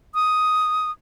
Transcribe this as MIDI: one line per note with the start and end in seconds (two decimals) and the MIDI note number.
0.15 0.91 87